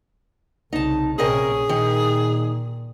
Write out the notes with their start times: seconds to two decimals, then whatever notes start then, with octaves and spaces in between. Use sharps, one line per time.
0.73 C2 C#3 D#4 A5
1.19 A#1 C3 C#4 G#4 A#4 D#5
1.69 A#2 D#3